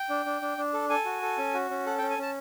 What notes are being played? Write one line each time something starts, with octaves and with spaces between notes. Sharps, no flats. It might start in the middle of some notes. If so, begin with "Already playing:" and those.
Already playing: G5
D4
D4
D4
D4
A4
A4 G#5
F#4
A4
C#4
F#4
C#4
A4 F#5
G5
C#4
G#5
C#4 A5